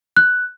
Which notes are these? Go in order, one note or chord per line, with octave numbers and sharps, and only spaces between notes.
F#6